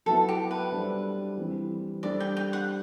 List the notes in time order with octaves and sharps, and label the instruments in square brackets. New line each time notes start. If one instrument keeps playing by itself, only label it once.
[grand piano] F#3 B3 E4 [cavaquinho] A4
[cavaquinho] G4
B4
[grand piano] G3 D4 A4 C5
E3 G3 C4
[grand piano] G3 D4 A4 C5 [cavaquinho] D5
[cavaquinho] G5
G5
F#5